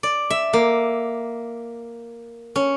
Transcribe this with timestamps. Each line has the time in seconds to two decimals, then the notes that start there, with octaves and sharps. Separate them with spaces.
0.03 D5
0.30 E5
0.53 A#3
2.56 C#4